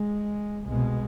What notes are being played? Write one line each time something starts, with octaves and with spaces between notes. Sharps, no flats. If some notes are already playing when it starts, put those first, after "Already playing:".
Already playing: G#3
C2 B2 G#3